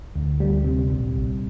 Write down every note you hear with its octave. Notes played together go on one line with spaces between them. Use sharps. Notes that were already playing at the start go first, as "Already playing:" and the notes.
D2
G3
C3
A#1
A#1